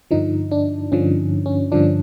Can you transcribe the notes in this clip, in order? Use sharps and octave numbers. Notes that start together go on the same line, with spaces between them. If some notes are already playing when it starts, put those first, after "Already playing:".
G2 D3 F3 D#4
D4
G2 D3 F3 C#4
C#4
G2 D3 F3 D4